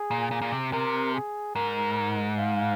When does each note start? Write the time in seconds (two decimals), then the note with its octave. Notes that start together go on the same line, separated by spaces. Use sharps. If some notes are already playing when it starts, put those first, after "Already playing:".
Already playing: G#4
0.11 A#2
0.31 A#2
0.42 A#2
0.52 C3
0.72 C3 A#4
1.14 G#4
1.55 G#2 A#4
2.38 F5